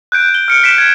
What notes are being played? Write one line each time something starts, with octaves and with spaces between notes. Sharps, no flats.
F#6 G6 D7
G7
F6 C#7 D7
B6 D7 E7
G#6 E7